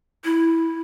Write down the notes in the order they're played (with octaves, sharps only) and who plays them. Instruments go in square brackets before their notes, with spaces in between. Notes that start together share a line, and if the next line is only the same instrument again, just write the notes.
[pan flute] E4